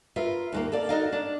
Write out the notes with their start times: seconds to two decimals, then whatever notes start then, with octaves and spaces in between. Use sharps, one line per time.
0.16 F4 A#4 B4 E5
0.52 D#2 G#3 A#3
0.72 A4 A#4 D5 F5
0.89 D#4 F#4 A4 A#4 D#5 F5
1.12 D4